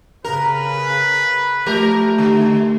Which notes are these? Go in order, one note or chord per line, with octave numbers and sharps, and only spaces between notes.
C#3 A#4 B4
F3 A3 G4 A#4
D3